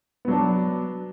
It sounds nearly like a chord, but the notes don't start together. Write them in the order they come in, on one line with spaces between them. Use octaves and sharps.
B3 F#3 D4